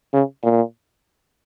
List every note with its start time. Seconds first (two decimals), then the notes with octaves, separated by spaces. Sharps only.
0.13 C#3
0.43 A#2